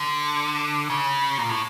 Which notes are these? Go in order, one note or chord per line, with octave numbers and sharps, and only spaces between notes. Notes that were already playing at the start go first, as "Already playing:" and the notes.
Already playing: D3
C#3
A#2
A2